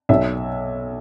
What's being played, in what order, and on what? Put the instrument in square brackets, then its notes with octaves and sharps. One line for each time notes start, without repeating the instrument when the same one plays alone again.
[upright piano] B1 E5